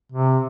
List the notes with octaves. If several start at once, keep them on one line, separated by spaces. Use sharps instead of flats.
C3